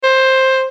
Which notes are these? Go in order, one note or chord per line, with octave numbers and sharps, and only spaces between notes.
C5